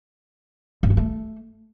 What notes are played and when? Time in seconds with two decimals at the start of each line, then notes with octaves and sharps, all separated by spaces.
0.83 G2
0.90 G#3
0.97 A3